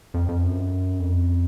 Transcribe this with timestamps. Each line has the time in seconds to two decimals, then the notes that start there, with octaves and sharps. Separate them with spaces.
0.14 F2
0.29 F2
0.43 F#2
0.99 F2